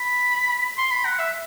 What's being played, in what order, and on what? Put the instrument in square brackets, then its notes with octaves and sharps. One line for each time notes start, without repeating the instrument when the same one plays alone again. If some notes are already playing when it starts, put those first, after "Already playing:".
Already playing: [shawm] B5
C6
B5
F#5
E5